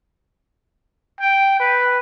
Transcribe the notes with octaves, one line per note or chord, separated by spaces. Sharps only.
G5
B4